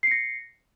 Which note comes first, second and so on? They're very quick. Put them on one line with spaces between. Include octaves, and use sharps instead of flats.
C7 C#7 A#6